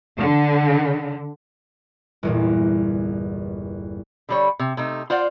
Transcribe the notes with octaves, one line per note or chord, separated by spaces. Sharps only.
D3
G1 E2 A#2
D3 G3 C#5
C3
C3 A3 D#4
F4 C5 D5 F#5